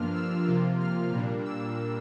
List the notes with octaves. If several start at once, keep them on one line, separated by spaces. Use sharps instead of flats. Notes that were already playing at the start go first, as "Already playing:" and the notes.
Already playing: G2 F3 A#3 D4 F4 F6
E6
C3 F3 A#3 F4
F6
A#2 G3 A#3 D4
E6